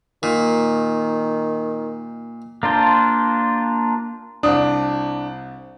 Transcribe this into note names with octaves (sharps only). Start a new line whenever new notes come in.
A#2 D#3
A#3 D4 F4 C5
C2 D4 D5 D#6